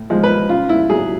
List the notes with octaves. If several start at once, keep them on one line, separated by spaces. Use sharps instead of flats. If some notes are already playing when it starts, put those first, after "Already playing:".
Already playing: A2
F3 G#3
B4
C#3 F4
E4
F#3 G#4